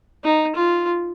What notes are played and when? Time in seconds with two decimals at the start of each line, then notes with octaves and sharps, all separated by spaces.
0.24 D#4
0.56 F4